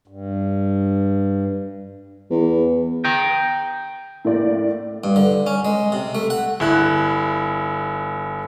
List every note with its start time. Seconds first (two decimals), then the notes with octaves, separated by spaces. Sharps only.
0.08 G2
2.30 E2
3.05 G5 A#5
4.25 A2 A#3 D5
5.04 G2
5.16 D3
5.46 C#4
5.65 G#3
5.92 C3
6.15 A3
6.30 F#5
6.60 G1 E4 F#6